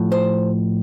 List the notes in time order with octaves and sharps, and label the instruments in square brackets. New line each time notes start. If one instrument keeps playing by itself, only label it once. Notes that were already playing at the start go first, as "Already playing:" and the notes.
Already playing: [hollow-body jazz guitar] A2 F3
C5